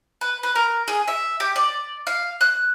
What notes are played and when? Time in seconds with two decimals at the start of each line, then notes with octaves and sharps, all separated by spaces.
0.21 B4
0.43 B4
0.55 A#4
0.88 G#4
1.08 E5
1.40 G4
1.56 D5
2.07 F5
2.41 F#6